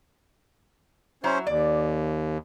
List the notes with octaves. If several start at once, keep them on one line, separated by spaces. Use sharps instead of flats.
F#3 C#4 E4 C5
D#2 D5